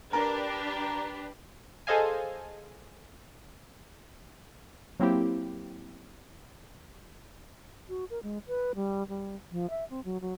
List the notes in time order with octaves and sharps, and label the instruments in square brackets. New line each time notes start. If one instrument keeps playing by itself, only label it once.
[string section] D4 G4 B4 [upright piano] A#4
[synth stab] G#4 A4 C5 D#5 F5 G#5
[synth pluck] F#3 A#3 C4 E4 G4
[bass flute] F#4
A#4
G#3
B4
G3
G3
F3
E5
C4
F#3
F#3